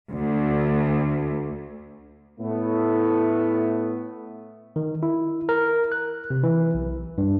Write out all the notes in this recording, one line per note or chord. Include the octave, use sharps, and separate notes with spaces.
D2
A2 A3 B3
D#3
E4
A#4
F#6
C3
E3
B1
G2